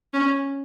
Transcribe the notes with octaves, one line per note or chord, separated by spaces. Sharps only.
C#4